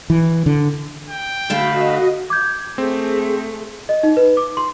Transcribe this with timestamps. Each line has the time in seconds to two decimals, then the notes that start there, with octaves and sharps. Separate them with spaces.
0.10 E3
0.46 D3
1.10 G5
1.50 D3 A3 F#4 D#5 F5 B5
2.30 D6 G6 G#6
2.78 A3 C4 G#4
3.89 D#5
4.03 D#4
4.17 B4
4.37 D6
4.57 C6